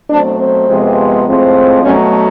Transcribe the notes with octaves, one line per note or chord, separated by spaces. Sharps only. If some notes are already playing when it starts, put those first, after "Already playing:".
B2 F#3 A3 C4 D4
C4
F2 C3 F3 G#3 B3
A2 F3 G#3 C4
B2 F#3 A3 C#4